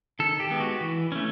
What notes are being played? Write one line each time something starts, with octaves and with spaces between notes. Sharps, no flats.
D#3 A4
G4
G#3 B3
F#4
E3
A3 C#4